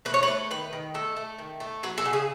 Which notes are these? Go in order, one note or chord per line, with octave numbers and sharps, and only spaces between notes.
A3 B4
C#5
B4
A3
D#3 B4
D#3
A3 A4
A3
D#3
A3
F#3 B4
A4
C#3
G#4